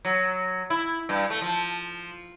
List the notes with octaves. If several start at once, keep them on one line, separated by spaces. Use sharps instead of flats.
F#3
E4
G2
A3
F3